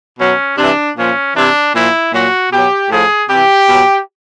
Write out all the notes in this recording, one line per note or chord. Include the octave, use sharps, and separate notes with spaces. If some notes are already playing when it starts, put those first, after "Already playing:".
B2 F#3 C#4
C3 E3 D4
A#2 F3 C#4
C3 E3 D4
A#2 F3 E4
A#2 F#3 F#4
B2 F#3 G4
A2 F3 G#4
C3 E3 G4
B2 F#3